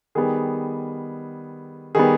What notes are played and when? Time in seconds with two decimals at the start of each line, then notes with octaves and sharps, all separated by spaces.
0.15 D#3 G3 B3 G#4
1.95 D#3 G3 B3 G#4